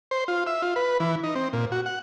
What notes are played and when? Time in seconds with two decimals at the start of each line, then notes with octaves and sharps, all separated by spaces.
0.11 C5
0.28 F4
0.47 E5
0.62 F4
0.76 B4
1.00 E3
1.24 D#4
1.35 C4
1.53 A#2
1.72 F#4
1.86 F#5